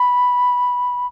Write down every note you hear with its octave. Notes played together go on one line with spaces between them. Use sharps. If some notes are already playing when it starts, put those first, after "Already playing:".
Already playing: B5